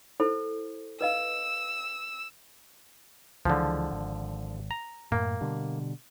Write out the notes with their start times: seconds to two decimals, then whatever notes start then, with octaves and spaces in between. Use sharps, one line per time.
0.20 E4 A4 C5
1.01 B4 D#5 F5 E6
3.45 C#2 D3 E3 F3 G#3
3.91 G#1
4.71 A#5
5.12 F#2 A2 A#3
5.41 B2 D3 G3